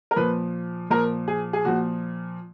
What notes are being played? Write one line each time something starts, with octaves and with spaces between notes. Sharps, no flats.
A#4
A#2 F3 B4
A#2 F3 A#4
G#4
G#4
A#2 F3 F#4